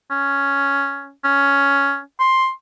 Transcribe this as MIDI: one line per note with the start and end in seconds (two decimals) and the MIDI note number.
0.11 1.11 61
1.24 2.00 61
2.20 2.51 84